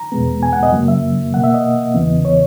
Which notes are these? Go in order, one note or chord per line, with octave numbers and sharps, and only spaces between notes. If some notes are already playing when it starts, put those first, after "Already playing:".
Already playing: A#5
E2 B2 G#3 B3
G#5
F#5
D#5
F#2 C#3 F#3 A#3
E5
B2 A#3 F#5
E5
D#5
E2 C#3 E3 B3
C#5